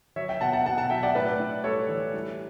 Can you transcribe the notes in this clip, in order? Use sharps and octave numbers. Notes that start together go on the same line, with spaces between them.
F#3 C#5 E5
E5 G5
B2 F#5 A5
F#5 A5
B2 F#5 A5
F#5 A5
F#3 E5 G5
D5 F#5
A2 B4 D5
A2
G3 A4 C#5
E3
G3